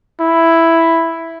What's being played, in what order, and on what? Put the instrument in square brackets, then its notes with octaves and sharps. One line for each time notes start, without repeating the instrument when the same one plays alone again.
[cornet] E4